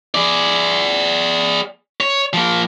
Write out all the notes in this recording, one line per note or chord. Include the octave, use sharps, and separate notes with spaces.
G#4 D5
C#5
F3 A#3